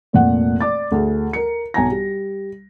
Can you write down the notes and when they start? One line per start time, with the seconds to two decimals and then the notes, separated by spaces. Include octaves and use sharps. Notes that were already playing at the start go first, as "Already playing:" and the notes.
0.13 F1 A#2 F#5
0.61 D5 D6 A6
0.92 D2 G#4
1.33 A#4 C#7
1.74 B1 G#5 A#5 A#6
1.91 G3